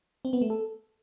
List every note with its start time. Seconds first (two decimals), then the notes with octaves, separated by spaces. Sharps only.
0.25 C4
0.33 B3
0.42 A3
0.50 A4